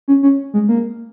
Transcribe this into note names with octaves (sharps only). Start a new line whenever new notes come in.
C#4
C#4
G#3
A#3